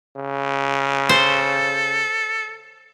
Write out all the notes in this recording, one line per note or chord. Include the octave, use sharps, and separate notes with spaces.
C#3
A4 C5